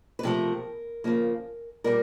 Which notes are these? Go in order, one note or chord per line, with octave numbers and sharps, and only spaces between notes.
B4
C3 F3 A3 A#4
C#3 F3 A#3
A#2 G3 A#3 A#4